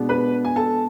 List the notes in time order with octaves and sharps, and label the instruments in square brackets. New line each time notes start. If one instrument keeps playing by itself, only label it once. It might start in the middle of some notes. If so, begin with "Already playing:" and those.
Already playing: [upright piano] B2 G#3 B3 D4
B4 B5
G#5
A4 A5